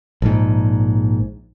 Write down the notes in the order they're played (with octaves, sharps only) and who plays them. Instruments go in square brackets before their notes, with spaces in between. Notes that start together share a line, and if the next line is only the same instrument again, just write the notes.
[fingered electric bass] A#1 G#2